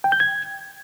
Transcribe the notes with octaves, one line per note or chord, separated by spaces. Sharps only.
G5
G6
G#6